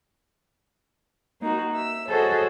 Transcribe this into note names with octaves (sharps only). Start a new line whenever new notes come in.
A#3 D#4 F#4
E5 E6
F#4 G#4 A4 C5 C#5 D#5